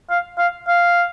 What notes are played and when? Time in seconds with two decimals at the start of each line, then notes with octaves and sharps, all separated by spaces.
0.10 F5
0.38 F5
0.68 F5